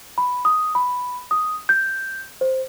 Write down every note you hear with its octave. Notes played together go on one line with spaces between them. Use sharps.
B5
D#6
B5
D#6
G6
C5